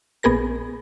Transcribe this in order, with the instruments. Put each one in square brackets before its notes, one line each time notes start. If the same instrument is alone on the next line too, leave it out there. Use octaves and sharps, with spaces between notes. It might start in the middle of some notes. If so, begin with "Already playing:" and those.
[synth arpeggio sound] A#1 B3 G#4 A#4 A#6